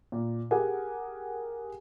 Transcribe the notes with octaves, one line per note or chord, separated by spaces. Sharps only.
A#2
G4 G#4 A#4 F#5 G#5